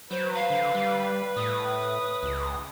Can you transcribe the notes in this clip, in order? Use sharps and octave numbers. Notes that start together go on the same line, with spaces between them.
F#3 B4 C5
F5
D3
G3
A2 D#6
C#2